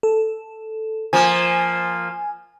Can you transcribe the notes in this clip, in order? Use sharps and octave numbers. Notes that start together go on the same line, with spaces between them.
A4
F3 A#3 G#5